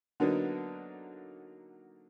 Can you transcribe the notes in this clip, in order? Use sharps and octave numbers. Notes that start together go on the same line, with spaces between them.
D3 F#3 A#3 B3 D4 D#4